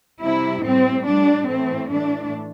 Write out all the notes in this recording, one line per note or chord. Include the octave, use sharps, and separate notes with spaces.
C3 G3 E4
A2 G3 C4
A2 G3 D4
A2 E3 A3 C4
A2 E3 A3 D4